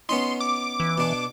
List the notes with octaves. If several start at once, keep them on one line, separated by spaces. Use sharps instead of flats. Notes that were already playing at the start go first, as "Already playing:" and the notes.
B3 C#4 D#4 C6
D6
E3
B2 D4